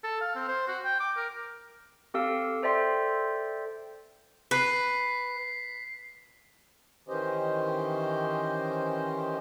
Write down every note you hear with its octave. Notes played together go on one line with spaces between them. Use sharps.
A4
F5
C4
C5
F#4
G5
D6
A#4
C4 G4 A4 F5 E6
A4 C5 D5 E5 G5 C6
B4 B6 C7
D#3 E3 C#4 G4 C5 D#5